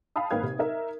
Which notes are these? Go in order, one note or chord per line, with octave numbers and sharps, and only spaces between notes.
F5 G5 A5 B5 D#6
G#1 A#3 B4 F5 G#6
C3
D#4 A#4 E5